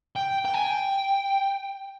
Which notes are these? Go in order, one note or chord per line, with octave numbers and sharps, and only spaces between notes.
G5
G5
G#5
G5